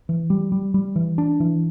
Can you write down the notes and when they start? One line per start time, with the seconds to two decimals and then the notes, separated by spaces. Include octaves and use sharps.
0.09 E3
0.30 G3
0.52 G3
0.74 G3
0.96 E3
1.18 D4
1.40 E3